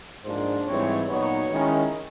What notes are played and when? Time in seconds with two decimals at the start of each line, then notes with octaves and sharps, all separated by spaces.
0.25 G#2 F3 A#3 D4 F4 C5
0.67 G#2 E3 G3 C4 C#5
1.09 A#2 F#3 B3 D#4 C#5
1.50 D#3 G#3 C#4 E4